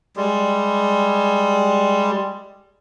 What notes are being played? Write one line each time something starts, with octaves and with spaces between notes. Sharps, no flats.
G3 G#3